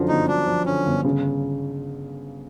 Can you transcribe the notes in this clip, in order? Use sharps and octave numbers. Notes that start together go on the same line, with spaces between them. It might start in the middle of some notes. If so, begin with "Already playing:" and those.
Already playing: F#2 D3 F3
G1 D#4
F#2 D4
F3
D3 C#4
G1
C#3